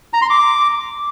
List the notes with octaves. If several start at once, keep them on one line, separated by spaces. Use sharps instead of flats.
A#5
C6
D6